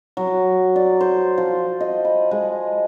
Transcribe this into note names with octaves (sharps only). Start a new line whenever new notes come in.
F#3
D5
C5
F3
D#5
B5
G#3